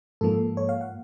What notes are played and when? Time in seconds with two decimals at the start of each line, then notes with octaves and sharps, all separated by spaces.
0.21 G#2 F3 A#3 A4
0.57 C#5
0.69 F5
0.81 F#5